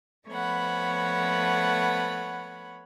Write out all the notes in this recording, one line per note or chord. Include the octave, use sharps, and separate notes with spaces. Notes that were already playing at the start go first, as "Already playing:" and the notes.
F3 A3 B3 C#5 F#5 B5